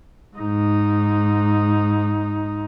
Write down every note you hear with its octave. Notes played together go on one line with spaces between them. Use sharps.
G#2 D#4